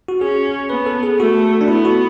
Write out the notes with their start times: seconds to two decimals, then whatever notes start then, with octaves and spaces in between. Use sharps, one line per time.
0.08 F#4
0.21 C#4 G#4
0.70 B3 B4
0.86 A4
1.03 G#4
1.19 A3 F#4
1.61 D4
1.68 B3 E4
1.85 F#4